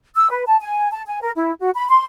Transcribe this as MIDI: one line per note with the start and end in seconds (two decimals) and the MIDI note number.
0.16 0.30 88
0.30 0.44 71
0.46 0.57 81
0.60 0.89 80
0.92 1.02 81
1.07 1.21 80
1.22 1.30 70
1.36 1.53 64
1.60 1.70 66
1.75 1.88 83
1.89 2.04 84